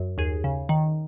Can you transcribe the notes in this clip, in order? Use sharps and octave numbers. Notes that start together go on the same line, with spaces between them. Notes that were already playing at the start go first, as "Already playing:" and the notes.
Already playing: F#2
D#2 G#4
C#3
D#3